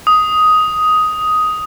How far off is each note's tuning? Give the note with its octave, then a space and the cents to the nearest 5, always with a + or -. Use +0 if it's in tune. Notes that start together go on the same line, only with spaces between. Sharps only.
D#6 +10